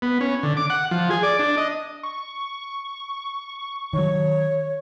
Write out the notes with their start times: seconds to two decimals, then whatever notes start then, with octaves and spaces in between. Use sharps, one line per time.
0.02 B3
0.21 C#4
0.43 D3
0.57 D6
0.70 F#5
0.91 F3
1.10 G#4
1.23 D5
1.39 D4
1.57 D#5
2.03 C#6
3.93 D#3 F#3 C#5